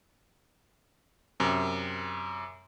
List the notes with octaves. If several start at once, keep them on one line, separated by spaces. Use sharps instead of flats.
F#2 C3